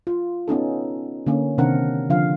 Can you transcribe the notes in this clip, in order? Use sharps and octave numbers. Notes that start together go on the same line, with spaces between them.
F4
B3 C#4 D#4 A4
D3 A#3 C#4
C3 D#3 C4 D4 A#4 F#5
D3 F3 F5